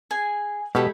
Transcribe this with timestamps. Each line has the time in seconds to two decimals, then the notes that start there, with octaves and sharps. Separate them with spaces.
0.11 G#4 G#5
0.75 B2 G#3 E4 G4 A4 B5